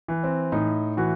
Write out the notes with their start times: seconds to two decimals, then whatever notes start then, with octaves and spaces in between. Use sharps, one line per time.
0.08 E3
0.24 C4
0.52 A2 D#4
0.97 E3 F#4